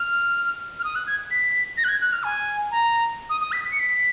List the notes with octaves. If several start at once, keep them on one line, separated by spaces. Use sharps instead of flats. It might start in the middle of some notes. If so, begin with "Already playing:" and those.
Already playing: F6
F6
D#6
F#6
G#6
B6
A#6
F#6
G#6
F#6
F6
G#5
A#5
D#6
D#6
B6
B6
C#7
B6